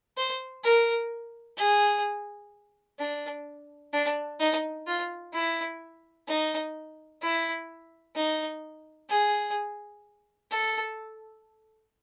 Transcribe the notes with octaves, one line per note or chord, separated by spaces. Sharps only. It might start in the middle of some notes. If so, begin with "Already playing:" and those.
C5
A#4
G#4
D4
D4
D#4
F4
E4
D#4
E4
D#4
G#4
A4